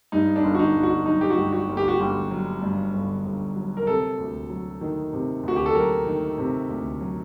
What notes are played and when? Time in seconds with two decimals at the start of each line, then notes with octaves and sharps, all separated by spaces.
0.12 G2 D#4
0.36 D4
0.43 G1
0.55 F#4
0.59 D#4
0.75 G1
0.83 F#4
1.06 F#3 D#4
1.21 G4
1.30 F#4
1.37 G2
1.53 F#4
1.69 G1
1.77 G4
1.88 F#4
2.00 G1 G4
2.31 F#3
2.62 G2
2.93 G1
3.25 G1
3.56 F#3
3.77 A#4
3.87 C3 A4
4.18 D2
4.50 F#3
4.81 D#3
5.13 C3
5.43 D2 F#4
5.56 G4
5.66 A4
5.75 F#3 A#4
6.06 D#3
6.38 C3
6.69 D2
7.00 F#3